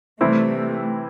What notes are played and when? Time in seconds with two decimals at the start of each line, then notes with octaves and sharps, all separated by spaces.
0.21 C3 E3 G3 A3 C4 E4